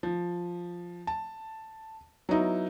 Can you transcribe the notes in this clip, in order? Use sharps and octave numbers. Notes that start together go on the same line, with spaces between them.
F3
A5
F#3 B3 D#4 E4